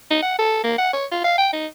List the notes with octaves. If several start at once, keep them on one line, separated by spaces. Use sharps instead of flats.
D#4
F#5
A4
A#3
F#5
C#5
F4
F5
G5
D#4